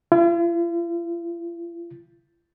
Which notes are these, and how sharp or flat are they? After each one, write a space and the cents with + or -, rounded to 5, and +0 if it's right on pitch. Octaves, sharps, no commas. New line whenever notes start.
F4 -45